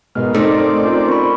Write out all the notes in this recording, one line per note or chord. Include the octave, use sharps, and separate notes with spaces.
G#2 B2 A#4 D#5 F6
A3 C4 D#4 D5
C#4 F4 A#4
B5 C#6